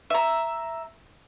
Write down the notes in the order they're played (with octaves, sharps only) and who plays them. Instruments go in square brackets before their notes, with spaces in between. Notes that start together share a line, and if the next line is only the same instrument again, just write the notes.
[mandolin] E5 A#5